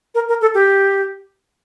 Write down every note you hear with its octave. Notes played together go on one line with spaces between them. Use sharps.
A#4
A#4
A4
G4